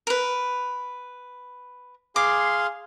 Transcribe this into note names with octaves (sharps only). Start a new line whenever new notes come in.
A#4 B4
G#4 F5 C6 D6